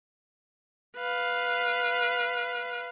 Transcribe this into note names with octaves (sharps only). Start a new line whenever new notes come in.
B4 F5